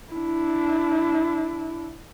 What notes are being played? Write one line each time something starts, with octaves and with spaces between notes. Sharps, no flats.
D4 E4